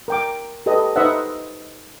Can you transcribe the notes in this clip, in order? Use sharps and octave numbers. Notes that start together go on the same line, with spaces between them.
A#4 G5 D6
G4 A4 B4 D#5
D#4 B4 C5 D#5 E5 F#5